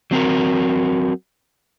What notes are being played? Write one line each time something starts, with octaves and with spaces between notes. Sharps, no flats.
F#3 C4 F#4 A#4